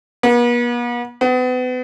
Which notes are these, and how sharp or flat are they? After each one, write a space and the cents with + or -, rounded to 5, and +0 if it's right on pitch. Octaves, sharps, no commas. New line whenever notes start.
B3 -45
B3 +35